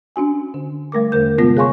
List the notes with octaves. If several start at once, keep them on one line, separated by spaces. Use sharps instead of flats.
C#4 D4 F#4 G#5
D3
G3 A3 A#4 D6
E2 D3 A#4 G6
G2 C3 G#3 B3 F4 A#6
G#4 C#5 F5 G#5 C6 C#6